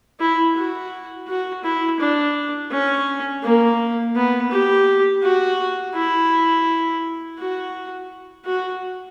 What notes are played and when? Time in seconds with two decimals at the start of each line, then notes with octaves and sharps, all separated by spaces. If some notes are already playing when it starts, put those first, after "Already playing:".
0.20 E4
0.56 F#4
1.27 F#4
1.64 E4
1.99 D4
2.71 C#4
3.43 A#3
4.15 B3
4.51 G4
5.22 F#4
5.95 E4
7.38 F#4
8.45 F#4